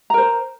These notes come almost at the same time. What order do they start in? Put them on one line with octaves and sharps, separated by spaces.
A#5 A#4 C5